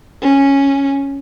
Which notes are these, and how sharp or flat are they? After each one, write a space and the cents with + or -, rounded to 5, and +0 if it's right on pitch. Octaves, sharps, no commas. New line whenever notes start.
C#4 -5